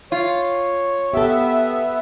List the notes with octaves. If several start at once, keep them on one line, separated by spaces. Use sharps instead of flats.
F4 C#5
B3 G4 A4 E5